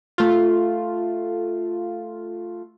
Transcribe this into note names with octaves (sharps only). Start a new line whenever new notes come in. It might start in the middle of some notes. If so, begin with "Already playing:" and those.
A3 F4